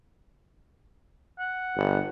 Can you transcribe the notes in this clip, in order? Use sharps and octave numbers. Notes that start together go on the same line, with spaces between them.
F#5
G1